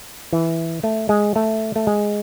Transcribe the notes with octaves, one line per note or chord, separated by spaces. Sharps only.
E3
A3
G#3
A3
A3
G#3